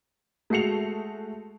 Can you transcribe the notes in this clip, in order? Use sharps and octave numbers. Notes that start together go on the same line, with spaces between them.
G#3 A3 F#4 C7 C#7 F7